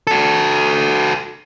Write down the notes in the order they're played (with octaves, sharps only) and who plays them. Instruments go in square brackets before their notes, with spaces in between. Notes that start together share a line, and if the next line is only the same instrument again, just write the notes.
[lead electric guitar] F#4 A4